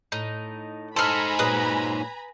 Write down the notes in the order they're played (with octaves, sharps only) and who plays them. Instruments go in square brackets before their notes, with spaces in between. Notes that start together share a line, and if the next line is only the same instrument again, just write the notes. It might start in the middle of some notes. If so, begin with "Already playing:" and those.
[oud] A2 [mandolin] D#4
[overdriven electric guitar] D#4 C5 [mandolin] A4 F6 [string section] G#5 A#5 B5
[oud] A#2 F#3 G#3 [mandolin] B4 D#6